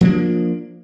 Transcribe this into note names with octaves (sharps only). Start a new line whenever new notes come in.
F3 A#3 D4